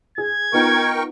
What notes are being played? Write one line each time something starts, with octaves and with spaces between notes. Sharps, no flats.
G#4 G#6
B3 D#4 F4 A#4 G5 C#6